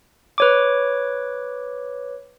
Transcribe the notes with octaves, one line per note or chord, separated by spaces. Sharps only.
B4 C#5 D6